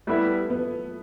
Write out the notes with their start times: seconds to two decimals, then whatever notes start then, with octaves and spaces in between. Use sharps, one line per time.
0.07 G3 A3 B3 E4 B4 E5
0.50 B3